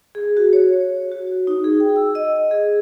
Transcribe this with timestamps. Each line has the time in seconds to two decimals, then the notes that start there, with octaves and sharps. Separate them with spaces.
0.15 G#4
0.37 F#4
0.53 C#5
1.11 F#4
1.47 D#4
1.64 G#4
1.80 G5
1.96 E6
2.15 D#5
2.51 G#4